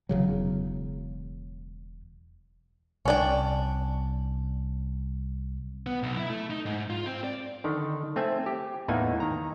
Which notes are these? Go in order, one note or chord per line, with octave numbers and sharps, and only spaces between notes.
E1 C#3 F#3
C2 C#4 D4 G5
B3
B1
E4
A3
D#4
G#2
F4
C4
D5
D3 D#3
A3 C4 E5 G#5
G4
E2 A2 E3 A#3 D#4 G#5
D#3 A#5